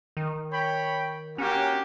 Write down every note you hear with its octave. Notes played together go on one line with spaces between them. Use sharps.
D#3
C#5 G5 B5
A#3 C#4 F#4 G4